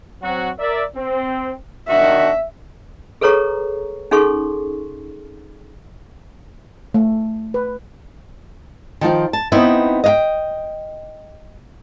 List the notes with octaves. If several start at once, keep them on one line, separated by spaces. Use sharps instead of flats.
F#3 C4 F#4
A#4 D5 E5
C4
D#3 D4 F#4 E5
G#4 A4 B4 C#5 A#5 C#6
C#4 D#4 G#4 A4 C6 C#6
A3
B4
D#3 F3 F4 G5
A5
B3 C4 D#4 E4 B4 E5
D#5 F5 G5